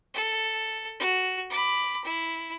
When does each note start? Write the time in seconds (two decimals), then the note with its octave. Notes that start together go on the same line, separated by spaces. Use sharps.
0.14 A4
1.00 F#4
1.50 B5 D6
2.05 E4